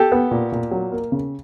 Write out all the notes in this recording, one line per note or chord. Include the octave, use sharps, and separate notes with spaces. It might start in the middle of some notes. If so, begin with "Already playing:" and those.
Already playing: G4 A4
B3
A#2
A#2
F#3
A#3
C#3